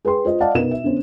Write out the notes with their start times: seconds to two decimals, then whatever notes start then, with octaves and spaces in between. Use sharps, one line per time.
0.05 G#4 B4 G5 C6
0.25 F4 C5 D#5
0.40 D5 D#5 F5 F#5 A5
0.54 B2 B3 D#4 A#4 B4 E7
0.71 E5
0.84 D3 B3 C#4 C5